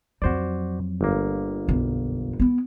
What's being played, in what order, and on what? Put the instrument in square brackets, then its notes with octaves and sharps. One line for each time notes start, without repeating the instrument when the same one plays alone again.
[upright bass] F2 F#3 [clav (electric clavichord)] F#4 C5 D5
[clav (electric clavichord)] G1 A#3
[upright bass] B1 F#2
B3 E4